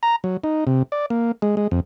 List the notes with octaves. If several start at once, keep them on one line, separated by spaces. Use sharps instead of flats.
A#5
F#3
D#4
C3
D5
A#3
G#3
G#3
F2